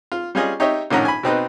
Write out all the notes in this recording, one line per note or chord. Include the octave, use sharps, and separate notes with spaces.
F4
G3 C#4 F4 G#4 D#5
D#4 G4 C#5 D#5 E5
A#1 A2 D#3 C#4 F#5 A#5
G#5 B5
B2 C4 D#4 B4